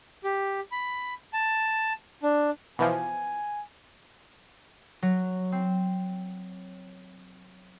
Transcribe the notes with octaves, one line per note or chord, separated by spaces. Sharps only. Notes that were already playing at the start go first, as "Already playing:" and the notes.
G4
B5
A5
D4
B2 E3 F3 G#5
F#3
C4